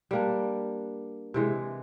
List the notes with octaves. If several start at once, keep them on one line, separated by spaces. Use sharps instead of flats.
G3 A#3 D4
C3 E3 G#3